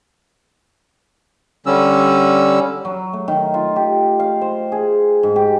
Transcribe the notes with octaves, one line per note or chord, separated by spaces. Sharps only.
D3 G3 C#4 E6
F#3
A3
D#3
F4
G4
F5
C5
G#4
G#2
G4